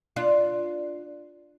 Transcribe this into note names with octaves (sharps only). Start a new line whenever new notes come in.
D4 F4